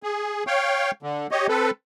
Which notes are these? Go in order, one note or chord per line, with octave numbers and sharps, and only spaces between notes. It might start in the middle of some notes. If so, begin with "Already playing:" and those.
G#4
C#5 F5 G5
D3
G4 C#5 D#5
C4 A4 B4